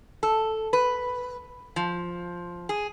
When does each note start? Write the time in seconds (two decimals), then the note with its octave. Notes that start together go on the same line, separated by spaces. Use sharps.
0.23 A4
0.73 B4
1.76 F3
2.69 G#4